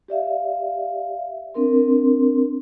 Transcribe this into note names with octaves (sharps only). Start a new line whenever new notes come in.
G4 D5 E5 F5
C4 D4 A#4 C6